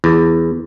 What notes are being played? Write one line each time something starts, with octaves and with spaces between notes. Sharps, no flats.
E2